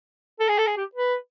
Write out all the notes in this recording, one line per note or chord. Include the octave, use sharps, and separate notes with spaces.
A4
G#4
A4
G#4
G4
B4